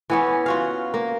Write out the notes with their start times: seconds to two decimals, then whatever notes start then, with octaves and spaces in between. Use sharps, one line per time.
0.10 E3 B3 C#4
0.46 F4 F#4 F5
0.94 A#3